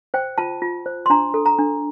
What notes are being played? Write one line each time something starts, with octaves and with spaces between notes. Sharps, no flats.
C5 G5
F4 A5
F4
C5
C6
D4 A#5
A4
A#5
D4